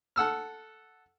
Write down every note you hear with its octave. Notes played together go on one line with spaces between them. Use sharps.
A4 F#5 E6 F6